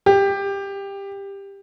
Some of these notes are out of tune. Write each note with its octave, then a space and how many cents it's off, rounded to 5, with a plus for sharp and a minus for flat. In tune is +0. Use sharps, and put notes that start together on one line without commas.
G4 +15